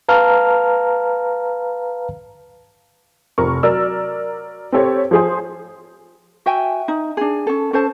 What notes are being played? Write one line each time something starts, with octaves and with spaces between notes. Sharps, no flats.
B4 F5 A5 A#5 F6
F1 F3 A#4 C#6
F#3 A#4 D5 E6
C4 G4 A4 C#5
F3 G#4 C5
F#4 E5 G5 G#5
D#4
D4 G#4
C#4 A4
C#4 A4 C5 A5